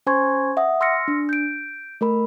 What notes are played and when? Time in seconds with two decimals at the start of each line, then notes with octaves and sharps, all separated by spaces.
0.06 C#4 C5 G#5 C6 C#6 G#6
0.57 E5 F#5 D#6
0.81 C6 E6 F6 A#6 C#7
1.08 D4
1.29 G6 D7
2.01 A3 A#4 B5